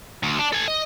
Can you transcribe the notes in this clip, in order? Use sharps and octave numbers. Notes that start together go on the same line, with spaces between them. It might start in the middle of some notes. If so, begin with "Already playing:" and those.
D2
D4
A4 G#5
D#5